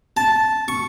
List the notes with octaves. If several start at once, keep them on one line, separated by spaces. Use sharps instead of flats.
A5
C#6